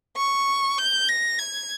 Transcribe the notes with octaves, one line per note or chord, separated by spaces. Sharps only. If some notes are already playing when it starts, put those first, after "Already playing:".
C#6
G6
A#6
G#6